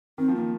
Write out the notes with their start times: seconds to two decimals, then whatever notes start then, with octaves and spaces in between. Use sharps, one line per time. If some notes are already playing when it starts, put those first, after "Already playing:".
0.18 D#3 C4
0.28 F3
0.36 D#3 A#3